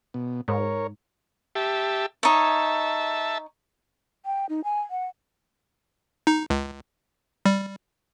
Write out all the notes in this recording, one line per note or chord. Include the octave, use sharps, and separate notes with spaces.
B2
G#2 A#4 C#5
G4 E5 A5
D#4 C#5 E5 A5
G5
D#4
G#5
F#5
D#4
C#2
G3